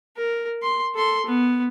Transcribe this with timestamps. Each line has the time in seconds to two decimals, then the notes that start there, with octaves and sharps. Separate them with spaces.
0.17 A#4
0.63 C6
0.95 A4 C6
1.26 B3